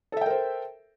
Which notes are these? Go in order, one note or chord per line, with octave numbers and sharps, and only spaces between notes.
A4 A#4 C5 E5 G5